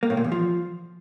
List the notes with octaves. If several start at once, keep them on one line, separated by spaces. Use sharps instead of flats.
A#3
A2
A#2
E2
F3